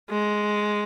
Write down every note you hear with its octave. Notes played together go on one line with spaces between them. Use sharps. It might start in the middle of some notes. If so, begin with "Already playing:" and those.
G#3